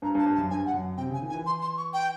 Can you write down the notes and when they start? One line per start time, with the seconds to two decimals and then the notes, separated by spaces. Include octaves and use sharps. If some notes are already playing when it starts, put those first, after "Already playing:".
0.02 G2 A#5
0.15 G2
0.19 A5
0.26 G2
0.35 A5
0.38 F#2
0.50 G2 G#5
0.66 F#5
0.74 F#2
0.97 C3 G5
1.10 C#3
1.14 G#5
1.22 D#3
1.30 G#5
1.34 E3
1.46 C6
1.62 C6
1.78 C#6
1.94 G5